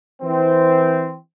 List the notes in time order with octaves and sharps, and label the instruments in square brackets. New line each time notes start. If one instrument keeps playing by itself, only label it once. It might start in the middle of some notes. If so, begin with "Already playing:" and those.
[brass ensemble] E3 C4